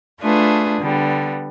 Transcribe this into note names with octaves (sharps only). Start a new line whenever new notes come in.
A3 D4 F4 G#4 B4
D3 G3 B3